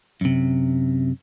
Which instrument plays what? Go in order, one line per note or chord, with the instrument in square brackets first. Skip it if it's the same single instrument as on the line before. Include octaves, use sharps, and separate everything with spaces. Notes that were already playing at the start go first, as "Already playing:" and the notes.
[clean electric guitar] F#2 C3